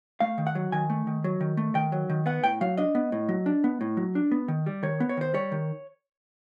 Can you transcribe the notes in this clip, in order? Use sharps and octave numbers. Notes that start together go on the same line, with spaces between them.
A3 F5
D#3
F#5
F#3
D#3 G#5
A3
D#3
F#3
D#3
A3
D#3 G5
F#3
D#3
B3 F#5
A2 G5
F#3 F5
D4 D#5
B3
A2
F#3
D4
B3
A2
F#3
D4
B3
D#3
G3
D#3 C#5
B3
C#5
D#3 C5
G3 C#5
D#3